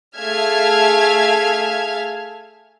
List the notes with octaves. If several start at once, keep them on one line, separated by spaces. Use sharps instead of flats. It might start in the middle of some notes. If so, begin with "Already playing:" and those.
A3 G#4 E5 F5 F6 G#6